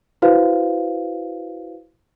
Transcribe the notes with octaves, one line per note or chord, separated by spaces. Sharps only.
E4 F#4 B4 C5 F5